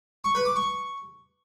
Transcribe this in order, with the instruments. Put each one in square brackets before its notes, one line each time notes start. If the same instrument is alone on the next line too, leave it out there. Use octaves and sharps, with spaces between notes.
[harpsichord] C#6
B4
D6
C#6